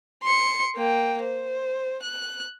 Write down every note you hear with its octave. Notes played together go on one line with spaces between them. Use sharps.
C6 C#7
A#3 G5
C5
F#6